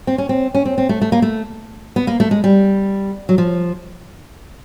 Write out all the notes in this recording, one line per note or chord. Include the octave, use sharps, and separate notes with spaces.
C4
C#4
C4
C#4
C4
C4
A3
A3
A#3
A3
B3
A#3
A3
G#3
G3
F#3
F3